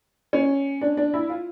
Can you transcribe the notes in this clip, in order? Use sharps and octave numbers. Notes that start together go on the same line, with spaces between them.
C#4
D4
D4
E4
F4